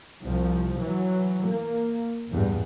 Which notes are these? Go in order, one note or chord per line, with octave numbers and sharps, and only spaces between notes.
C2 F3
E3 F#3
A#3
A1 E2 G2